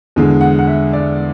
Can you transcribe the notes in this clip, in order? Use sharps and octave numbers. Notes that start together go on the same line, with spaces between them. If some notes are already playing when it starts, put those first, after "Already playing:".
E2 D3 G#3
F#5
F#5
E5
D5